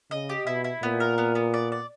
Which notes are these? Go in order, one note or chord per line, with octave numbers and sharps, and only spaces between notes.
C#3 D#5
G4
B2 E4
E4
A#2 B3
A#4
B3
B3
D5
D5